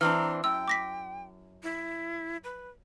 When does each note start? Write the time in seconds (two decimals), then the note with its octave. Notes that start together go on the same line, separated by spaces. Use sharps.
0.01 E3 C4 D4 A#5 F6
0.44 F#2 G5 E6
0.68 D6 A#6 B6
1.63 E4
2.44 B4